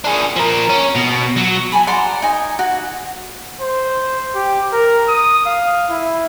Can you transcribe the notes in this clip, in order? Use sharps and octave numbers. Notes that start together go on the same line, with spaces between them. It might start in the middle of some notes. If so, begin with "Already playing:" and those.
D4 G#4
F3 A#4
C#4
B2
F#3
G#5 A5 B5
D5 F#5 A#5 C6
D#4 G#5
F#4
C5
G4
A#4
D#6
F5
E4